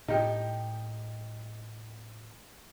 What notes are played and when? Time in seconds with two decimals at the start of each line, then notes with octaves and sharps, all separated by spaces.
0.08 A2 D#4 G4